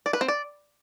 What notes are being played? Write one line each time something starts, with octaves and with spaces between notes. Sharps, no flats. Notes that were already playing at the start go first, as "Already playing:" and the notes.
D5
B4
C4
D5